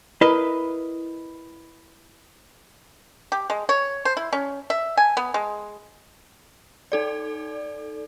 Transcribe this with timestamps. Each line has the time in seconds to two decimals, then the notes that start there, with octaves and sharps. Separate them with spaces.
0.21 E4 A#4 B4 D#5
3.32 G4
3.50 G#3
3.69 C#5
4.05 C5
4.17 E4
4.33 C#4
4.70 E5
4.97 G#5
5.17 B3
5.34 G#3
6.92 D#4 A4 D5